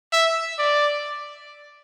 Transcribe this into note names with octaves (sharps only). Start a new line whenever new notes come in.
E5
D5